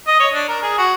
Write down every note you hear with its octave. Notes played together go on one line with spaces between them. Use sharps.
D#5
C#5
D4
A#4
G#4
F#4